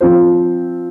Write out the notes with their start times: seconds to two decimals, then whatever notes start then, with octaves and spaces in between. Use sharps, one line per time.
0.01 F3 C4 F4 C5